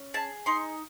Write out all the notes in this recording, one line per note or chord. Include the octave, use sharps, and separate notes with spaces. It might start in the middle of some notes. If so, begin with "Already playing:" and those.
Already playing: C#4
G#4 A5
D#4 C6